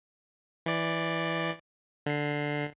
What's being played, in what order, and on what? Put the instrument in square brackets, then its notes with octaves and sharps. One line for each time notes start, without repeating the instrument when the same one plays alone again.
[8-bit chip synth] E3 D5
D3 C7